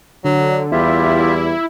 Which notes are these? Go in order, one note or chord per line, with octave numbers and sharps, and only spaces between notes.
D3 F#3
E2 G3 E4 F4 G4 E5